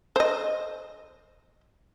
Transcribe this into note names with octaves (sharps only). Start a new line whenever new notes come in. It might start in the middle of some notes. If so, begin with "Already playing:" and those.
C5 D#5